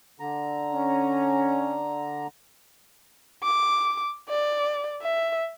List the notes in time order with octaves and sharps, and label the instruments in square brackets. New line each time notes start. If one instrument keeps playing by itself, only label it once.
[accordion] D3 A#5
[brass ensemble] C#4
[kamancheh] D6
D5
E5